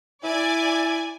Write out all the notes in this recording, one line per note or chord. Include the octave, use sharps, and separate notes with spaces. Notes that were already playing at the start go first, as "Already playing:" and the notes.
E4 D5 G#5